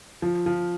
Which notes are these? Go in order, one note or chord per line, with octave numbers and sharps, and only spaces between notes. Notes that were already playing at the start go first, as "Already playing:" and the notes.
F3
F3